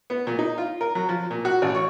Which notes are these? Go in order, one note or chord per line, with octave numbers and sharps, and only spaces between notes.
B3
A#2
D#4
F4
A#4
F#3
F3
A#2
F#4
A1
C#5